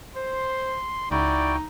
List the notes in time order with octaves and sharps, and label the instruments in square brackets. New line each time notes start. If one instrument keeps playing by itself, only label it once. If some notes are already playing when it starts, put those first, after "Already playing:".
[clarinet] C5 [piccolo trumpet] C6
[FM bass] C#2 [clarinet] D#4 [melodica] E4 F#4 G5 [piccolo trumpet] D5